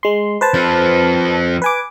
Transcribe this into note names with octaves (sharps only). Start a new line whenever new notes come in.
G#3 C6
B4 C5 A5
F3 C4
B4 G#5 D6